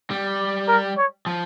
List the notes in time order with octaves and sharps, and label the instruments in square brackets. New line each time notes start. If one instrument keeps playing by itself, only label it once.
[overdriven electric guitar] G3
[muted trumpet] A#4
C#5
[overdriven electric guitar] F3